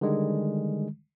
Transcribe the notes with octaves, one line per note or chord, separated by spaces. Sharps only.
D3 D#3 G3 G#3